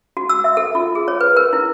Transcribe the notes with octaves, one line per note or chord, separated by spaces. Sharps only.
F#4
E6
E5
A4
F4
G#4
C#5
B4
A#4
E4